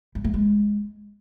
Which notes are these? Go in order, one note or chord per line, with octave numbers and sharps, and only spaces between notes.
G3
A3
G#3